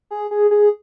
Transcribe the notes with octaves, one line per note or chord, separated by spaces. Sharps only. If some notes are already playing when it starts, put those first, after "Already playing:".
G#4
G#4
G#4